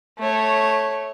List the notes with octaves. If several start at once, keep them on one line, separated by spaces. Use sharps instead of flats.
A3 C#5